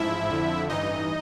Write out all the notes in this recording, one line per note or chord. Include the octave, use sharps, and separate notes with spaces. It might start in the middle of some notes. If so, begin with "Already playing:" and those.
Already playing: A1 G#2 F3 E4 E5
F2 D3 F3
A1 G2 E3 D#4 D#5